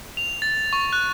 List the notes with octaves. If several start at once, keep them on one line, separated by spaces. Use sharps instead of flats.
F7
A6
C#6
F#6